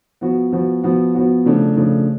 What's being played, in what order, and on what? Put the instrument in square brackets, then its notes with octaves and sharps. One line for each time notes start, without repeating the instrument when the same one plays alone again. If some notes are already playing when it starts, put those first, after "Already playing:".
[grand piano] F3 B3 F#4
F3 B3 F#4
F3 B3 F#4
F3 B3 F#4
C#3 F3 A3 D4
C#3 F3 A3 D4